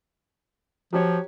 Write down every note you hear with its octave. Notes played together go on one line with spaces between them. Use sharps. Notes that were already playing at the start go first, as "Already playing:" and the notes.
F3 F#3 G4 C#5